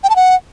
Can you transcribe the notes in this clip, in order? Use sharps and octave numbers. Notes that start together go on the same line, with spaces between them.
G5
A5
F#5